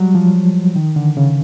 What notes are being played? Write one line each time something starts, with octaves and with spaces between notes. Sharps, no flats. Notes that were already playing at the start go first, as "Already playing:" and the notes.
Already playing: F#3 G3
F3
D#3
D3
C#3